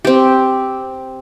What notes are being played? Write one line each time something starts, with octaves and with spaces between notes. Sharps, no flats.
C4 G4